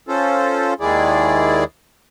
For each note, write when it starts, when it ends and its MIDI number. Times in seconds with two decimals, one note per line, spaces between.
0.08 0.74 61
0.08 0.74 65
0.08 0.74 69
0.08 0.74 72
0.80 1.64 39
0.80 1.64 51
0.80 1.64 56
0.80 1.64 64
0.80 1.64 68
0.80 1.64 74